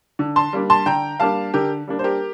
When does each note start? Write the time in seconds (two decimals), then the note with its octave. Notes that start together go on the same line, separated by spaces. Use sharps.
0.19 D3
0.36 A5 C6
0.53 G3 A#3 D4
0.70 A5 C6
0.86 D3 G5 A#5
1.20 G3 A#3 D4 F5 A5
1.54 D3 G4 A#4
1.87 G3 A#3 D4
1.99 C5
2.04 G4 A#4